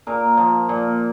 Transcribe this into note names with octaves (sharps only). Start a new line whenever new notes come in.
A#2 A#4
F3
A#2